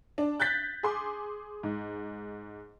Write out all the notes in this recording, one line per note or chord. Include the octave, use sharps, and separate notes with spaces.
D4
F#6 G6 A6 B6
G#4 C6 D6
G#2